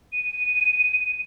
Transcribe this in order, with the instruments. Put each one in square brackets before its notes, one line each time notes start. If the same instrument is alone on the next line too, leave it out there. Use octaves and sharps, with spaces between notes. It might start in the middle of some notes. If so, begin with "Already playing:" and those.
[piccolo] D#7